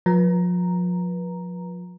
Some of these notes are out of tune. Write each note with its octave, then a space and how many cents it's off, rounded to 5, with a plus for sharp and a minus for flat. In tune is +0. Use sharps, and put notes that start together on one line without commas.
F3 +35 B4 -30 A#5 +0